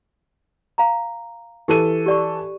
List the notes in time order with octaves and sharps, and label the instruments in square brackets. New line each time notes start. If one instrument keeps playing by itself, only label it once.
[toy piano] F5 A#5
[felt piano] E3 A4 D#7 [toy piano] G4
[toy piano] G4 D5 C#6